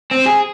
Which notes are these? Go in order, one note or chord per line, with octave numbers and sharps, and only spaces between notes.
C4
G#4